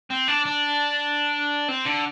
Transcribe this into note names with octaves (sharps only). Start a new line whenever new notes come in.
C4
D4
D4
C4
D3